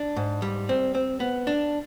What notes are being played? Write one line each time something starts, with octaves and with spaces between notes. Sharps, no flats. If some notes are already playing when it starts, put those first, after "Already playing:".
Already playing: D4
G#2
G3
C4
C4
B3
D4